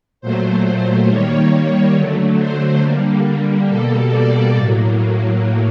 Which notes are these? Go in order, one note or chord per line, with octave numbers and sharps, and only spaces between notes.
A#2 F#3 A3 C5
C5
D#3 G3 A#3 C#5
C#5
D3 F#3 A3
C5
D3 G3 A#3
B2 G3 A#3 A4
D5
A2 F#3 A#3